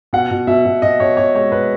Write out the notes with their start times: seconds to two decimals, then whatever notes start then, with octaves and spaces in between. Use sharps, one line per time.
0.13 B2 F#5
0.31 B2
0.47 B2 E5
0.65 B2
0.82 B2 D#5
1.00 B2 C#5
1.17 B2 C#5
1.35 G#3 C#5
1.52 B2 B4